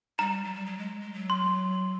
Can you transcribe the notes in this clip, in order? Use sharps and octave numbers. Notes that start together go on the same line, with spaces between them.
G3 A#5
G3
F#3
G3
F#3
G#3
G#3
F#3
C6